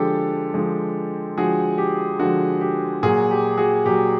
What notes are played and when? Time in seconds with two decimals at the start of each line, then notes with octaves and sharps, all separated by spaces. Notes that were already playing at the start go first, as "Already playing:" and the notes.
Already playing: D3 F3 G#3 G4 A4
0.54 D3 F3 G#3
1.38 D3 F3 G#3 F#4 G#4
1.78 G4
2.19 D3 F3 G#3 F#4
2.61 G4
3.03 A#2 F#3 F#4 G#4
3.31 G4
3.58 F#4 G#4
3.85 A#2 F#3 G4